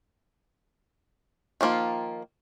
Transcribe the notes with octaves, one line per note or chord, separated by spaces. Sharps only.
D#3 F3 A#3 F4